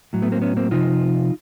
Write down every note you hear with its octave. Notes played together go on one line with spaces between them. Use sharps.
A2 F#3
A3 B3
A#3 C4
B3 C#4
A#3 C4
C3 F3 D#4 F4